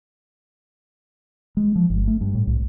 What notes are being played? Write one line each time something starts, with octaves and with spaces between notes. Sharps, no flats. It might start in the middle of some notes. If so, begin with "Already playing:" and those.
G#3
F3
G1
A3
G2
A2
C2